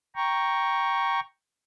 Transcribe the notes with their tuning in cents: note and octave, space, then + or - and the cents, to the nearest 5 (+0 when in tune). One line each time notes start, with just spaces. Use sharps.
G5 +0 A#5 +5 C#6 +0